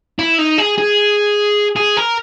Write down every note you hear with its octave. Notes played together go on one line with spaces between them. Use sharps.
E4
D#4
G#4
G#4
G#4
A#4